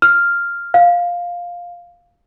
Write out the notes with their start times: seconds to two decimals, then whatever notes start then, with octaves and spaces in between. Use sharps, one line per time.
0.02 F6
0.74 F5